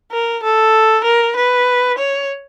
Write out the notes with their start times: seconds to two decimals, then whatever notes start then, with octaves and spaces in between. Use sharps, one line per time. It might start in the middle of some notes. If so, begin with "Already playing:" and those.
0.12 A#4
0.44 A4
1.04 A#4
1.36 B4
1.98 C#5